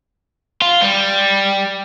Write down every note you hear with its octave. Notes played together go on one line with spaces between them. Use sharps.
F4
G3